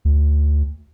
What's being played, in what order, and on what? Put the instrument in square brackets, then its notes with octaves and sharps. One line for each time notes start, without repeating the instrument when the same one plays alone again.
[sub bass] D2